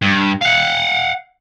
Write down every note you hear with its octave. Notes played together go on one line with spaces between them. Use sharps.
G2
F5 F#5